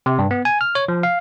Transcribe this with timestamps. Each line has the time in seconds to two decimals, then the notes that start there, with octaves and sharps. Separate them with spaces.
0.06 C3
0.19 G2
0.31 B3
0.45 G#5
0.61 F6
0.75 C#5
0.88 F3
1.03 F5